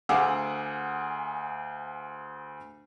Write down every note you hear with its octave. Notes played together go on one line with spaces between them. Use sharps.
D2 G#4 F5 F#5 D6 E6